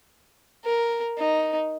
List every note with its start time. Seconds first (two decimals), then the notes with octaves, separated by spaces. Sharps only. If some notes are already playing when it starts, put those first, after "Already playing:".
0.65 A#4
1.18 D#4